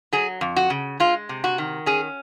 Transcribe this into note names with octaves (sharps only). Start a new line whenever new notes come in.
F#3 G#4
F2
F#4
C#3
G#3 F4
C3
F#4
D#3
C#4 G#4